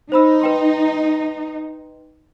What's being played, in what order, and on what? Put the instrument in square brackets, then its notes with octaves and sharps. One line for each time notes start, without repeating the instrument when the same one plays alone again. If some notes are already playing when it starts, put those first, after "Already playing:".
[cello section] D#4 [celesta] C5 B5 E6
[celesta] B4 G5 C6